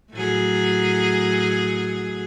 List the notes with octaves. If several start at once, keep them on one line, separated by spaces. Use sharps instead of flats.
A2 F#3 G#4